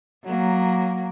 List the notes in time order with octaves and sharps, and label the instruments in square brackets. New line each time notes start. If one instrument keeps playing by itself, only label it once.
[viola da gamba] F#3 A#3